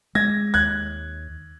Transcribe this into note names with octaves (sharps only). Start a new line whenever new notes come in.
G#3 G#6 A#6
D#2 F#6 G#6